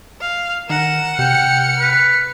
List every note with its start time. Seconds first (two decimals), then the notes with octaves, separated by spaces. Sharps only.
0.21 F5
0.70 D#3 A#4 F#5 E7
1.19 C3 G5 F6 C#7
1.79 B4